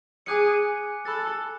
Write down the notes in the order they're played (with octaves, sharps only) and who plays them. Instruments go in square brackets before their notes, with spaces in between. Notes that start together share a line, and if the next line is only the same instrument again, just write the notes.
[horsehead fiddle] G#4 [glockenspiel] G#5 D6 F#6 C#7
[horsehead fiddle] A4 [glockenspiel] B5 F#6 A6